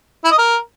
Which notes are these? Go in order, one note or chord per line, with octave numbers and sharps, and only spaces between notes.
E4
D#5
A#4